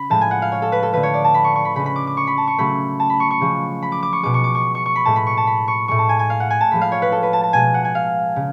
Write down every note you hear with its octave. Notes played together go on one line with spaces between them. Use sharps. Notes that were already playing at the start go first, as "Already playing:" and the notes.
Already playing: C#3 B5
A2 F3 G#3 A5
G#5
F#5
F5
C#5
A4
B4
A4
D3 F3 A3 B4
C#5
D5
A5
B5
C#6
C#6
B5
C#3 G#3 B5
B5
D6
D6
C#6
B5
A5
C#6
C#3 F#3 A3 B5
A5
B5
C#6
C#6
C#3 F3 G#3
B5
D6
D6
C#6
B2 G#3 D6
C#6
D6
C#6
C#6
C#6
B5
A2 G#3 A5
B5
C#6
A5
B5
C#6
A2 G#3 C#6
A5
G#5
G#5
F5
F#5
G#5
A5
A2 F3 G#3 B5
F5
C#5
B4
A4
B4
A5
A5
B2 G#3 G#5
F#5
G#5
F5
C#3